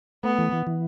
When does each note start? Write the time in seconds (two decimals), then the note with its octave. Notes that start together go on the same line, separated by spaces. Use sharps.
0.23 A3 B3
0.38 E3
0.53 E3
0.67 E3